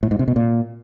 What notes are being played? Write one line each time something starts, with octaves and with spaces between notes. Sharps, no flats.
A2
G#2
C3
B2
A#2